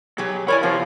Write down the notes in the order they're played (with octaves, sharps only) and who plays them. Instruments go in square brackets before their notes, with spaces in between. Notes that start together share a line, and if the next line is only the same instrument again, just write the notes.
[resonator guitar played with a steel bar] B2 G4 G#4 [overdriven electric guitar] F#3
[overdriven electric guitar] E4 B5 [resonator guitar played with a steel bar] A#4 D5 G#5 [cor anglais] C#5
[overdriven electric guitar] C3 [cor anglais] F3 [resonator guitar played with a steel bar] B3 A#4